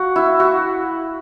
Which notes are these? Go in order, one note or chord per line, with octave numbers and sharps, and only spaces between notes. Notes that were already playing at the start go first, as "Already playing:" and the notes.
Already playing: F#4
E4
F#4